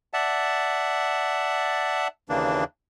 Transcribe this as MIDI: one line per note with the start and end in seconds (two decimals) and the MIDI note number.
0.14 2.08 74
0.14 2.08 76
0.14 2.08 78
0.14 2.08 81
2.29 2.64 39
2.29 2.64 49
2.29 2.64 52
2.29 2.64 58
2.29 2.64 62